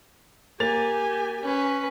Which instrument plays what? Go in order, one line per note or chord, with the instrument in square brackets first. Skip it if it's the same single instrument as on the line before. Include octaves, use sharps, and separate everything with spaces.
[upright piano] A#3 A6 F7 [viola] G4 G#5
[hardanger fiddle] C#4 B4